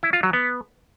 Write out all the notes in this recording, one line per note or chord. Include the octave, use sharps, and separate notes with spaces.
E4
F4
F#3
B3